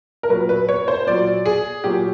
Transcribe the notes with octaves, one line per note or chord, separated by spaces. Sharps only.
A#4
A#2 F#3 B4
B4
C#5
C5
A#2 F#3 D5
G#4
A#2 F#3 G4